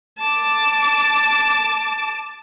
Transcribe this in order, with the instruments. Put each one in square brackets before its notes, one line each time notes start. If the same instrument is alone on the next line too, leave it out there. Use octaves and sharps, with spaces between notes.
[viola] A5 D6